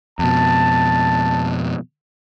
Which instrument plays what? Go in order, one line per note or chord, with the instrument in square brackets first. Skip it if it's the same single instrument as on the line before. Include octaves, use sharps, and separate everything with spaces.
[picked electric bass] F2 B2 [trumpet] A5